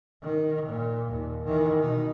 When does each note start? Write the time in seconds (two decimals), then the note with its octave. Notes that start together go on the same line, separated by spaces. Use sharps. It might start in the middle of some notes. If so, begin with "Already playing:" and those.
0.23 D#3
0.67 A#2
1.10 D#2
1.44 D#3 E3
1.81 B2 D#4